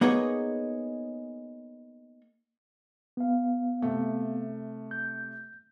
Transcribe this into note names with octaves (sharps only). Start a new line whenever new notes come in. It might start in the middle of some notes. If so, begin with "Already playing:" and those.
A#3 B3 D#4 G#4 C#5
B3 F5
C3 A3
G6